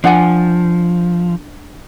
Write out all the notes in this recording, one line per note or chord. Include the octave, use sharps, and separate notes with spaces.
F3 D4 F#5 G#5